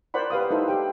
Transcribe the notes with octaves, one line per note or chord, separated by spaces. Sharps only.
A#4 C5 D5 F#5 B5
G4 B4 F5 D#6
D#4 E4 A4 C5 E5
G4 G5